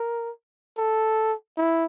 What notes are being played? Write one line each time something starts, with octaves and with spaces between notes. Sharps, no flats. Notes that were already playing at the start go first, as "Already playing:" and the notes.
Already playing: A#4
A4
E4